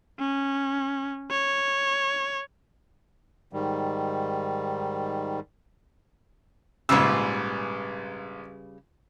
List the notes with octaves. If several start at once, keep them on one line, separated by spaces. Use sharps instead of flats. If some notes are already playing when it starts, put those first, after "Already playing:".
C#4
C#5
G#2 D#3 G3
A#1 G#2 C#3 G3 B4 E6